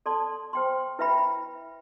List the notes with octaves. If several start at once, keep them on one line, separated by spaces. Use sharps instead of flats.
A4 D5 A5 C6
C5 G5 C6
E4 B4 E5 G5 B5